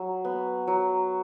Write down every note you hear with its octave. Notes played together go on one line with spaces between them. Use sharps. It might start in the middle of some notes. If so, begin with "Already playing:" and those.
Already playing: F#3
B3
F#3